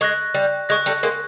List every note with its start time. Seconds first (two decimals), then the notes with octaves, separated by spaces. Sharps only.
0.01 G#3 C#6 F#6 A#6
0.34 G3
0.69 G#3 C#6 F#6 A#6
0.86 G3 A3
1.03 G#3 A#3